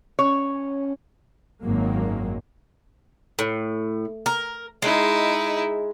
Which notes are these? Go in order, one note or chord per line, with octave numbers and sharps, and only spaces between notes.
C#4 C#5
G#1 F#2 D#3 F#3 G#3 A#3
A2
A#4
G#3 D#4 E4